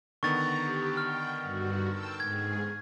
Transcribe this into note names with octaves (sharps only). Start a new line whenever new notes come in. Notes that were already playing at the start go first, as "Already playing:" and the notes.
D3 D#3 B3 A#5 C#6 A6
G4
G5 F6
G2 F#4
G5 A5 E6
G#2 G#4 G#6